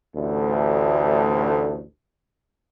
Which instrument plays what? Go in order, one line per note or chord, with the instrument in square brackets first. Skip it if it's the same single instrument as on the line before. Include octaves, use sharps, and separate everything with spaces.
[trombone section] A1 D2